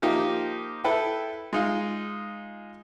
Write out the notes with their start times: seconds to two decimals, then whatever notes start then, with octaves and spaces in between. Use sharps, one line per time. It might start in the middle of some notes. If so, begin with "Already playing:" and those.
0.02 F3 A#3 D#4 G4
0.84 E4 A4 B4 G5
1.53 G#3 D#4 F4